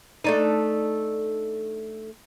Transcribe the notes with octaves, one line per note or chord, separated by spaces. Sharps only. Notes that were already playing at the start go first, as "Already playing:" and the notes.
A3 D4 D#4